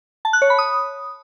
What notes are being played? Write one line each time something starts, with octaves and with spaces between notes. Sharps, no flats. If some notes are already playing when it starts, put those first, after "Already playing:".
A5
F#6
C#5
B5
D#6